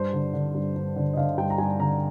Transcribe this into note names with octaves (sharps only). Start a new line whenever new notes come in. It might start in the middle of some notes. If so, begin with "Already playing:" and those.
Already playing: G2 C5
D3
D3
G2
G2
D3
D#5
D3 F5
G2 G5
A#5
G2 G#5
D3 A#5